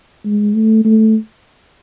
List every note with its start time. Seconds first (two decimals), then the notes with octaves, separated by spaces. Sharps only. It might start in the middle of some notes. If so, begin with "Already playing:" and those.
0.25 G#3
0.55 A3
0.85 A3